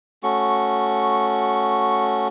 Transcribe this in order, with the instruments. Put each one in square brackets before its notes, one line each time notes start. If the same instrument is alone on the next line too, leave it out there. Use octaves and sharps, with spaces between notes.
[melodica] A3 C#4 F#4 C#6